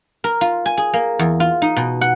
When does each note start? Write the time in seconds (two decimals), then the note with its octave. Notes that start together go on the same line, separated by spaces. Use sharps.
0.24 A#4
0.41 F4
0.66 G#5
0.78 G#4
0.94 A#3
1.19 E2
1.40 F4
1.62 D#4
1.77 B2
2.01 F#5